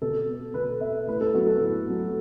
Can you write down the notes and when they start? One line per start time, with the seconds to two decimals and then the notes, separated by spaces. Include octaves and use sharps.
0.02 B2 A4
0.29 B3
0.54 B2 B4
0.81 B3 E5
1.07 A2 B4
1.21 A4
1.34 F#3 B3 F#4
1.47 A4
1.60 A2
1.87 F#3 B3